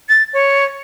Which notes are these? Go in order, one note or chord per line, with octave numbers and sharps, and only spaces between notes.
A6
C#5